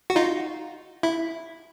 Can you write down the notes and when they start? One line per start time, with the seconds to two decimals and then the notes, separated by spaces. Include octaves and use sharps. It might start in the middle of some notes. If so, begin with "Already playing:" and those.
0.10 F#4
0.16 D#4 F4
1.03 E4